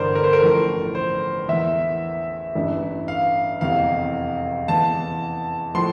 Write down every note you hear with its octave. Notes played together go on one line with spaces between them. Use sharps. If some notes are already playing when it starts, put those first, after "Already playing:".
Already playing: G1 G2 E3 A#4 C5 D5
A#4
C5
A#4
A1 A2 F3
C5
E2 E3 E5
A1 G2 E3
F5
F1 E2 C3 E3 F5
E2 E3 A5
A2 F3 C6